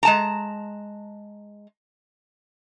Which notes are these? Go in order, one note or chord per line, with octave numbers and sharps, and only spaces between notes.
G#3 A5 A#5